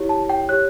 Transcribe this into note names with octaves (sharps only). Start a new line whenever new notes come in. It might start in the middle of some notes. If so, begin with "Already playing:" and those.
Already playing: E4 G4 C#5
A5
G5
G4 C#5 F#6